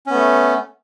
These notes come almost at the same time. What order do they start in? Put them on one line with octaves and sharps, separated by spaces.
C#4 B3 A3